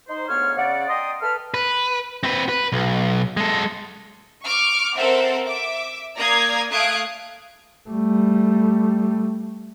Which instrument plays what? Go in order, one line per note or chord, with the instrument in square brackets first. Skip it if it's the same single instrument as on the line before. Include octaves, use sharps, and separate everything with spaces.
[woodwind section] D#4 C5
D2 G#2 B3 C#5 F5 F6
C#3 D5 F#5
D5 D#5 G5 A#5 C6 D#6
A4 B4 F6
[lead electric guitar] B4
C4 B4
B4
B1
G#3 A4
[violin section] C#6 D6 F6
C4 A4 A#4 C5 E5 F#5
E5 D6
A#3 D5 A#5 D#6 G#6 C7
A3 F5 D#6 F#6 G#6 D7
[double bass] G3 A3